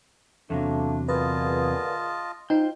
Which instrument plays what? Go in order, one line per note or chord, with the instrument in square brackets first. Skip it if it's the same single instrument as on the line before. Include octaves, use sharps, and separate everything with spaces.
[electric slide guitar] E2 C3 F#3 [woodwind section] A3 A#3 D4
[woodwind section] A#2 D3 G#4 [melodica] F4 D#5 A5 [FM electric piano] B4
[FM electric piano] D#4 [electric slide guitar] F4 C5 G5